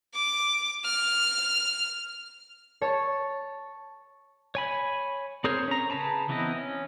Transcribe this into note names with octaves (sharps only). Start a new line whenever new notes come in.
D6
F6
C#5 A5 C#6
C#5 G#5 B5
C4 G#4 A#4 C5 C#5
C#4 A#5
C#3 G#4 B4 A5 A#5
E3 B3 C4 E4 D#5
C#4